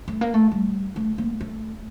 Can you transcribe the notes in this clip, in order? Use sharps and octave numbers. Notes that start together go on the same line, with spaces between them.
A3
A#3
A3
G3
A3
A#3
A3